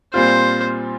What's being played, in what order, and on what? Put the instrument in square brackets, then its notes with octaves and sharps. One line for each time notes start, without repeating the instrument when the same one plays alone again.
[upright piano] A#2 G3 C4 F4 [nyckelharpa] C5